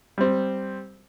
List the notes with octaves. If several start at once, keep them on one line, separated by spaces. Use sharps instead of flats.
G3 C4